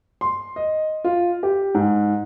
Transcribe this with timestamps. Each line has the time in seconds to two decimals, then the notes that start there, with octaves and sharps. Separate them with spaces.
0.21 C6
0.56 D#5
1.04 F4
1.43 G4
1.75 G#2